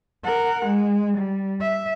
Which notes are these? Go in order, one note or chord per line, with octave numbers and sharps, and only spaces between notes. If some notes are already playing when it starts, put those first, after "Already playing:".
A#4 F#5
G#3
G3
E5